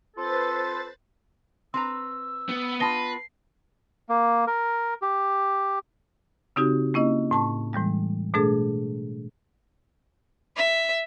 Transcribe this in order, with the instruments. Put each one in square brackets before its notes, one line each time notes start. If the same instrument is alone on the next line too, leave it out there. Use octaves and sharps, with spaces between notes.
[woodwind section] C4 F4 A4 [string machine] B4 C5 A6
[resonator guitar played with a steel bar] C4 B4 A#5 [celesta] C6 [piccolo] E6
[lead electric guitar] B3
[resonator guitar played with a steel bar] B3 F4 [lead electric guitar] B4 [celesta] A5 A#6 G7 [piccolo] C7
[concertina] A#3
A#4
G4
[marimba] C#3 C4 D#4 F#4 G4
A#3 C#4 E4 D#5
A2 A5 C#6
A2 E3 G3 G#3
B2 A3 D4 G#4 A4
[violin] E5